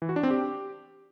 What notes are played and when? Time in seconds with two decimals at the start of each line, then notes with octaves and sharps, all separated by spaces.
0.02 E3
0.09 F#4
0.16 D4
0.23 C4
0.31 G4